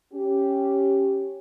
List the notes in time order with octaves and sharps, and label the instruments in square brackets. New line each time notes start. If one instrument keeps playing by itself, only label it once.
[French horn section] C#4 G4